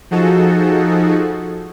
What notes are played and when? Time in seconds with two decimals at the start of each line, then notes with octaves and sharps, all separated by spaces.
0.11 F3 D#4 F#4 G#4 A4